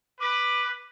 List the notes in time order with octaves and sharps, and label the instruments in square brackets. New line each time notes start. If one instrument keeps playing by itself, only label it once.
[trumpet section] B4 [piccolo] D6